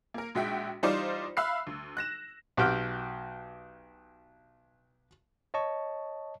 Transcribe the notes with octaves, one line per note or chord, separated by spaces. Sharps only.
A#3 A#4
A#1 G#3 F#4 E5 G5 B6
E3 G3 D#4 F4 C5 D5
E5 F5 B5 E6 F#6 C7
D2
F#6 A#6 E7
B1 F#4 G4 G5 F6
C#5 D#5 A5 C#6